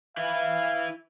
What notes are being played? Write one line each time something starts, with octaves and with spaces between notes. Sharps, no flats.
E4 B4 F5